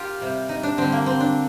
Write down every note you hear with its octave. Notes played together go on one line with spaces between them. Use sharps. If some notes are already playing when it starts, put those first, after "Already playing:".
Already playing: F4 G4 A#4
C3 G3
D#4
D4
D3 G3 C4
A#3
C4
D4